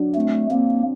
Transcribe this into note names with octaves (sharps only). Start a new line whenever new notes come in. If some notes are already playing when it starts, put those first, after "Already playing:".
Already playing: F#3 D4
A3 C4
A#3 C4